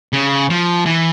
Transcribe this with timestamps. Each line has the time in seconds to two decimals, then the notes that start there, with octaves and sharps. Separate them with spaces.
0.13 C#3
0.50 F3
0.86 E3